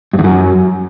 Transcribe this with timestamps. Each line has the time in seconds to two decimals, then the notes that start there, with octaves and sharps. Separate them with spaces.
0.13 G2
0.19 E2
0.24 F#2